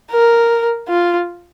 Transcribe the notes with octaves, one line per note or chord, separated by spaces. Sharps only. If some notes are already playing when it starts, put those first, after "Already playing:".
A#4
F4